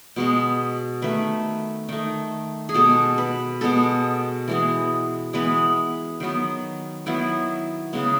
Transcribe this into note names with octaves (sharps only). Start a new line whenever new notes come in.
B2 G#3 B3
D#3 A3 B4
D#3 A3
G#4
B2 G#3 B3 A4
B4
B2 G#3 B3 A4
E3 G#3 B3
E3 G#3 B3 B4
D#3 F#3 B3
D#3 F#3 B3 E4
C#3 G#3 B3